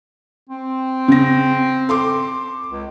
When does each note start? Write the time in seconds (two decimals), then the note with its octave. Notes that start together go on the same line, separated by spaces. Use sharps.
0.50 C4
1.08 C#3 A#6
1.89 A4 C6 D6
2.71 C#2